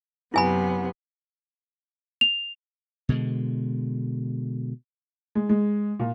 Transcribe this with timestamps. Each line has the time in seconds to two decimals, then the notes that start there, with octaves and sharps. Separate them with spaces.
0.34 F#2 C3 B3 E4 G#5 B5
2.21 F7
3.09 B2 D3 G#3
5.35 G#3
5.49 G#3
6.00 A#2